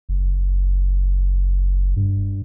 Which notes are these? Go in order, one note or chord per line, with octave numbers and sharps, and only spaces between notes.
F#1
G2